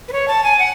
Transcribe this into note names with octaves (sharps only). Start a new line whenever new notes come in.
B4
C#5
A5
G#5
F#5